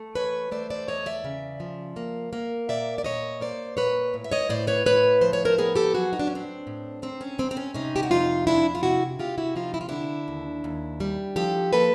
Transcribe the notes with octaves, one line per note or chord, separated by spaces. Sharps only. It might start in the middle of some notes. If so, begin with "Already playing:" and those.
Already playing: A3
E3 B4 C#5
A3 C5 D5
C5 D5
E2 C#5 D#5
D5 E5
C#3
F3
A#3
A#3
A#2 D5 E5
D5
A#2 C#5 D#5
A#3 C5 D5
A#2 B4 C#5
A2
E5
C#5 D#5
A2 C5 D5
B4 C#5
A2 B4 C#5
F3 C5
C#5
A#4 C5
B3 G#4 A#4
G4 A4
F#3 F#4 G#4
D#4
D4
A2 C#4
C4 D4
A2
C3 C4
C#4
F2 C4
C4
C#4
C3 C#4 D#4
G4
F#4
F2 D#4 F4
G#3 D4 E4
F4
C3 E4 F#4
C3 F4 G4
E4 F#4
F3 D#4 F4
E4
F4
D3 D4 E4
D#2
D#2
G3
F3 G4 A4
A#3 A4 B4